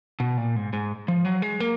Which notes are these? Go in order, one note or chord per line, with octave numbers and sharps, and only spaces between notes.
B2
A#2
G#2
G#2
F3
F#3
G#3
A#3